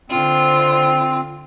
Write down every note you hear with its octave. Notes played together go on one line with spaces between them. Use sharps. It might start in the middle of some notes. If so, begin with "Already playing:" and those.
D3 C4 F4